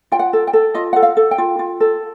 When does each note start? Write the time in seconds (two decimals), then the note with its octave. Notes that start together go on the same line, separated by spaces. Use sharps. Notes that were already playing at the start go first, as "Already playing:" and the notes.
0.12 F4 G5
0.19 F#5
0.33 A4
0.47 G5
0.53 A4
0.74 F4 D#5
0.93 A4 F#5
1.03 F5
1.17 A4
1.31 G5
1.38 F4
1.59 F4
1.80 A4